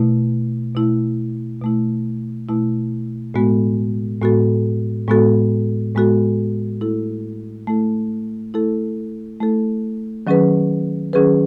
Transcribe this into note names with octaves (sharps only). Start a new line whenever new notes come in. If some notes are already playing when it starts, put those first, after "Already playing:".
Already playing: B2 A3 E4
B2 A3 E4
B2 A3 E4
B2 A3 E4
A2 G#3 B3 F#4 A4
A2 G#3 B3 F#4 A4
A2 G#3 B3 F#4 A4
A2 G#3 B3 F#4 A4
A3 E4 A4
A3 E4 A4
A3 E4 A4
A3 E4 A4
D#3 F#3 C#4 G#4 B4
D#3 F#3 C#4 G#4 B4